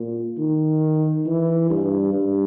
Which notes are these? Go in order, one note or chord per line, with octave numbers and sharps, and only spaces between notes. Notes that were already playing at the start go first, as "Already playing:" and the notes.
Already playing: A#2
D#3
E3
G2
G2